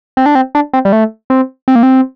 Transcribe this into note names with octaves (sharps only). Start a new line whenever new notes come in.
C4
D4
C4
D4
C4
G3
A3
C4
C4
A#3
C4